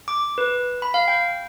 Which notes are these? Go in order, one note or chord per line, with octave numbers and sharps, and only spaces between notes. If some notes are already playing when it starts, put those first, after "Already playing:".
D6
B4
B5
F5
G5